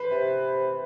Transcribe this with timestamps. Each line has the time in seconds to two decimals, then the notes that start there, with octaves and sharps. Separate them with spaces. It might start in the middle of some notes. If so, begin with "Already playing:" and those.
Already playing: B4 C5
0.11 C3